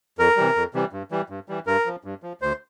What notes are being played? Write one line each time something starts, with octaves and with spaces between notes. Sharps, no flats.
F2 A#4
C3 E3 G3
F2
C3 E3 G3
G2
E3 G3
G2
E3 G3
G2 A#4
F3
G2
F3
D2 C5